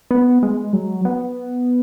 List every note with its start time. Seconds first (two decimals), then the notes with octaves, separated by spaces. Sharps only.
0.11 B3
0.43 G#3
0.73 F#3
1.05 B3